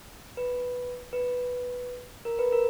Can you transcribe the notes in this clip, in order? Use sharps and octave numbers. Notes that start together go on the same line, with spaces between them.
B4
B4
A#4
B4
A#4